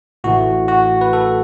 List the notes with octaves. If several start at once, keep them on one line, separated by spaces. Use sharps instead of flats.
A1 A2 E3 A3 F#4
F#4
B4
A4